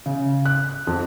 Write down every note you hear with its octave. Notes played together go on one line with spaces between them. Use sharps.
C#3
F#6
F2